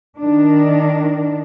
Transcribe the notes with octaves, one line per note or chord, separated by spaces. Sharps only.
D#3 D4